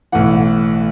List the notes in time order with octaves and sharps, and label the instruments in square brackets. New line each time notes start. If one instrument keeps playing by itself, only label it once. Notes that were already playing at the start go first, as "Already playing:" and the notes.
[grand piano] B1 A2 E3 F#5